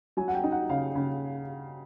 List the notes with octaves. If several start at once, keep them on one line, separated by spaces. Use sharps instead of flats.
F#3 G#5
F#5
G5
D#4
F#5
C#3 F5
C#3